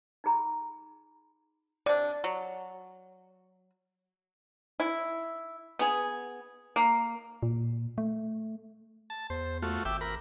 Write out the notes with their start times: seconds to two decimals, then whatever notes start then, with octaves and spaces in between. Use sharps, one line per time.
0.24 D#4 F4 G#4 A#5 B5
1.86 C3 D4 D5
2.24 F#3
4.80 E4
5.79 B3 G#4
6.76 A#3
7.43 A#2
7.98 A3
9.10 A5
9.30 E2 C5
9.62 A3 F4 F#4
9.85 G#1 E5 G5 D6
10.01 A#4 B5